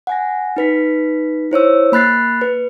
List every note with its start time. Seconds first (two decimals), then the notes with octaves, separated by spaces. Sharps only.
0.07 F#5 G#5 A#6
0.57 D#4 B4 B6
1.51 E4 C5 C#5 E6
1.92 A#3 B5 F#6 A6 C7
2.41 B4